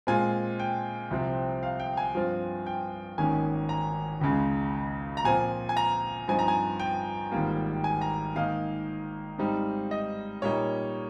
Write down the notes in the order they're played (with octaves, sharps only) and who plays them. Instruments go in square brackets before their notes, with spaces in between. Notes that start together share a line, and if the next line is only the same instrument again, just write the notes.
[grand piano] A#2 G#3 C4 F4 G#5
G5
C2 C3 F3 C4
F5
G5
G#5
G2 F3 C4 F4
G5
G#1 G#2 D#3 A#3 C#4 G#5
A#5
C#2 C#3 G#3
A#5
A#2 F3 C4 F4 G#5
G#5
A#5
G2 F3 C4 D#4 G#5
A#5
G#5
G5
G#1 G#2 G3 A#3 F4
G#5
A#5
G#2 D#3 A#3 D#4 F5
G#2 G3 C4 D#4
D#5
A#2 G3 A#3 D#4 C#5